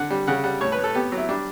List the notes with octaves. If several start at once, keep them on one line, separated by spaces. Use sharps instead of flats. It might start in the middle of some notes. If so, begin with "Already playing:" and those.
Already playing: D3 F#5
G3
C#3 F#5
G3 F#5
A2 C#5
B4
A2
A4
B3 G4
F#3
E4
G3 D4